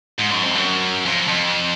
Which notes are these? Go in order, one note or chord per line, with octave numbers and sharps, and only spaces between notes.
G#2
F#2
F2
F#2
F2
F2